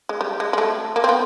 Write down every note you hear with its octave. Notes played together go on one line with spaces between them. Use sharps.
G#3
G3
G#3
G#3
A3
A#3
C4
B3